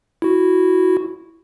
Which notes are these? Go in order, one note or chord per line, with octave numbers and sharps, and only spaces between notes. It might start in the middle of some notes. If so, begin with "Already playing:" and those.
E4 F#4